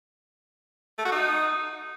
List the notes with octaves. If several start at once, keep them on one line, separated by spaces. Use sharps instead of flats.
A3
F#4
D#4